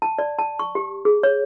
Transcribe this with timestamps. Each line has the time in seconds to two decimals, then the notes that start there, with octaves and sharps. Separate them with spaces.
0.02 A5
0.19 D5
0.39 A5
0.59 C#6
0.75 G4
1.05 G#4
1.23 C#5